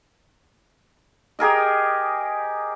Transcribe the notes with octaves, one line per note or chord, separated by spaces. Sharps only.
G4 G#4 A#4 D#5